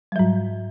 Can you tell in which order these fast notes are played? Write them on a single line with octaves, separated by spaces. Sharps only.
G3 F#3 G#2